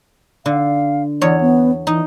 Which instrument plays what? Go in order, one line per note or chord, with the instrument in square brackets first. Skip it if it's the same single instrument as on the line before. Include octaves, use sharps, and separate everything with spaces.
[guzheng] D3 [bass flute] F5
[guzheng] E2 C#5 [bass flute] D5
[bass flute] B3
[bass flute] E3 [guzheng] D#4